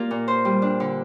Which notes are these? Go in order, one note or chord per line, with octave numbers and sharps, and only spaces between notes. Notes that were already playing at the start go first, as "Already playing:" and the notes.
Already playing: A#3 F4 G4 D5
A#2
C5
G3
D4
D3